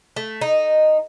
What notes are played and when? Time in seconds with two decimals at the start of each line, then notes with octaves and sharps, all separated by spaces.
0.16 A3
0.41 D#4